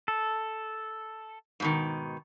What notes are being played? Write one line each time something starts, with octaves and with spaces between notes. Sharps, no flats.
A4
G#2 B2 D#3